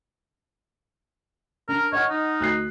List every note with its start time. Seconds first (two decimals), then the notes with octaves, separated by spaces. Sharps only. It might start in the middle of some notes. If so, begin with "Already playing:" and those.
1.69 D4 A#4
1.93 C#5 D#5 F#5 F6
2.10 D#4
2.40 D2 F#6 C7